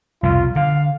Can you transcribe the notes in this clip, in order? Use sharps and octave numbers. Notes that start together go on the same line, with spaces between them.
C2 F2 B2 F4
D3 F5